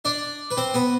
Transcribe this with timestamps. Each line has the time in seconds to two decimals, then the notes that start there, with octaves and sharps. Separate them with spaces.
0.05 D4 D5
0.51 B4
0.57 C4 C5
0.74 B3 B4